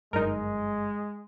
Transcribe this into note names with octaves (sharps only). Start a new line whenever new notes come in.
G1 F#2 G#3 D#4 A#4